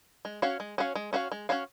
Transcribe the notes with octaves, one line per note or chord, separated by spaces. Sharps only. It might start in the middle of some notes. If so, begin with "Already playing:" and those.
G#3
C#4 F#4 C#5 F5
G#3
C#4 F#4 C#5 F5
G#3
C#4 F#4 C#5 F5
G#3
C#4 F#4 C#5 F5